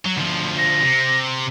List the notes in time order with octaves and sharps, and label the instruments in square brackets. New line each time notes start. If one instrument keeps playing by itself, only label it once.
[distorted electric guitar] F#3
D2 F3
[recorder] A#6
[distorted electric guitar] C3